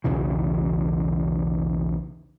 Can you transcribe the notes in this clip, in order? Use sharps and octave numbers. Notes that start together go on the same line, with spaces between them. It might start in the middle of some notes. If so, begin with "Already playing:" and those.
B1 E2 C#3 E3